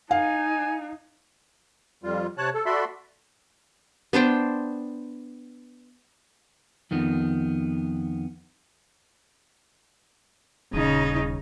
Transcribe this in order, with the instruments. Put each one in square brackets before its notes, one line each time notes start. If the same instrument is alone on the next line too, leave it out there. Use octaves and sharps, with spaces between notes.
[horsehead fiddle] D#4 [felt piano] F5 [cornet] G#5
[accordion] F2 G3 F4
C3 C#5 A5 F#6
A4
F#4 A4 D5 E5 B5 C6
[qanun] B3 D4 C5 G5
[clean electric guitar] F2 D#3 B3
[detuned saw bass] D#1 [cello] C#3 D#4